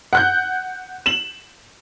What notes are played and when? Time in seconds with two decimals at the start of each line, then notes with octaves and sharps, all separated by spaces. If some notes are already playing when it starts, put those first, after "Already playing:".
0.13 F#5 F#6 G6
1.06 E7 F#7